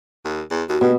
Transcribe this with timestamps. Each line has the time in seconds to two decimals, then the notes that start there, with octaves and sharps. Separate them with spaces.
0.24 D#2
0.51 E2
0.69 D#2 F#4
0.81 G2 B2